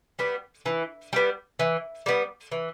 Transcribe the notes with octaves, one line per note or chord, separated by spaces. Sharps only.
G3 B3
E3
G3 B3
E3
G3 B3
E3